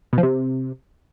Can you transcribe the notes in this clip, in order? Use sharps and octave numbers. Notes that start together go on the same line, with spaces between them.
B2
F3
C3